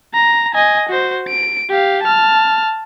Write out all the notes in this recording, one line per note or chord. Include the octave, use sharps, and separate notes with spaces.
A#5
D#5 G#5
F#4 C5
D7
G4 F5
A5 F6